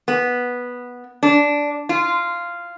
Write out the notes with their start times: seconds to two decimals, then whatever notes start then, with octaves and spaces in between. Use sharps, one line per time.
0.08 B3
1.23 D4
1.89 F4